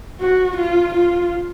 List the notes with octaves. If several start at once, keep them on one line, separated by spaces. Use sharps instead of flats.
F#4
F4
F4